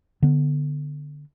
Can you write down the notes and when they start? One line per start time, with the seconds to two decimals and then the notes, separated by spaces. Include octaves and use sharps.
0.22 D3 B3